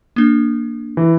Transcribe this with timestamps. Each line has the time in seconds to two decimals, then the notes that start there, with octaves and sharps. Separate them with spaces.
0.16 A#3 D4
0.97 E3